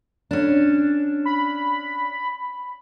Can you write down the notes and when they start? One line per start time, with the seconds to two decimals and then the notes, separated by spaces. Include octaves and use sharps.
0.31 C#4 D4
1.25 B5